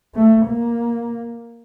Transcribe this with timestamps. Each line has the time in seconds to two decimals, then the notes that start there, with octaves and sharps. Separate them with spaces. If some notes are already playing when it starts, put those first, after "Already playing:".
0.15 A3
0.47 A#3